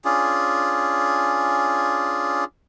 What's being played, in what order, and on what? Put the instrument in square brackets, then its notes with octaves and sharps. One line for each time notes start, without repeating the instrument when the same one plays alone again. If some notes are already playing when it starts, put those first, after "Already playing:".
[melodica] C#4 D4 F4 G#4